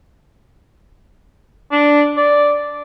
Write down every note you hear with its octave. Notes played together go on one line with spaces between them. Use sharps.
D4
D5